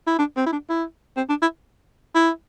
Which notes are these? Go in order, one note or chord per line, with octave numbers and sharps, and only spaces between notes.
E4
D4
C4
E4
D4
E4
C4
D4
E4
E4